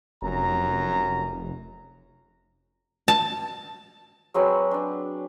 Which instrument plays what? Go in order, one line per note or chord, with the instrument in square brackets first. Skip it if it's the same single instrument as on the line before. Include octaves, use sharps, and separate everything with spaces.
[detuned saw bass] F1 [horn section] F#2 A#5
[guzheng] A5
[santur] F#3 G#3 C4 B4
D4 D5